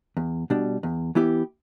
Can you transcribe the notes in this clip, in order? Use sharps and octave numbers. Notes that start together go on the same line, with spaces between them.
E2
B2 G3 D4
E2
E3 B3 E4 G4